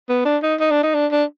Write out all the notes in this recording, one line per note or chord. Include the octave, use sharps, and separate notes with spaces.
B3
D4
D#4
D#4
D4
D#4
D4
D4